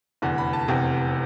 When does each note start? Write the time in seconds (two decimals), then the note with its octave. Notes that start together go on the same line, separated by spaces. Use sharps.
0.22 F1 E2 D3
0.38 B5
0.53 A5
0.68 F1 E2 C3 G5